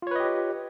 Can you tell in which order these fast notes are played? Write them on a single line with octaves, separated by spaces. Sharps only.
F4 C#5 B4 D#5 G4